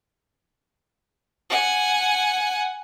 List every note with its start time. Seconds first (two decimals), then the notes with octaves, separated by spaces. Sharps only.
1.50 F#5 G#5